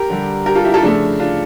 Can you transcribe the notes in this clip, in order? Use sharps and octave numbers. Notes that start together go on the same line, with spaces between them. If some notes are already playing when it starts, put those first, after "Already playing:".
Already playing: G4 A#4
D3 G3
G4 A#4
F4 A4
E4 G4
F4 A4
C#3 F3 A3 D4
D4 F4